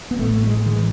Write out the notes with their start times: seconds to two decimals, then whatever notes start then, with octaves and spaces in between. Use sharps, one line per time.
0.11 B3
0.19 A1 A2 A3
0.47 G#3
0.66 D#3
0.73 E3